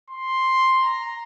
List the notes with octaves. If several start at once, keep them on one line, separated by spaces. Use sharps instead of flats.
C6
A#5